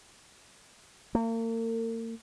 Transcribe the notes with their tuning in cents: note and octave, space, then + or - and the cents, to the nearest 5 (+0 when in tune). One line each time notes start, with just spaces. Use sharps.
A#3 -40